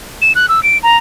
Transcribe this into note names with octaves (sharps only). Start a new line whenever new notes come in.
E7
F#6
E6
D7
A#5